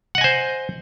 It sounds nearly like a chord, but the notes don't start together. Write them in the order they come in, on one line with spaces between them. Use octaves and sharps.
F#5 D#5 G#5 C5